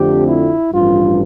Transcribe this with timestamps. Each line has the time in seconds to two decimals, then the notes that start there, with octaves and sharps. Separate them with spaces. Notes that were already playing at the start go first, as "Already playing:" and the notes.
Already playing: F2 D3 F3 A3 C4 G4
0.27 E4
0.71 A1 G2 F3 F4